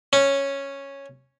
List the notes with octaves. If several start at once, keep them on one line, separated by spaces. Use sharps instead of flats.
C#4